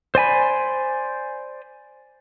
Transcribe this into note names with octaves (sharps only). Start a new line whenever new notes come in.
C5 D5 G#5 B5